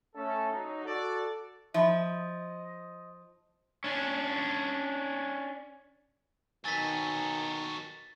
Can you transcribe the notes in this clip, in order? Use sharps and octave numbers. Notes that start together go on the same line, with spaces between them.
A3 C#4 A4
F#3 D#4
F#4 A4 D5
F3 D#5 E5 B5
C#4 D4
B2 D#3 F#3 A4 G#5 A6 B6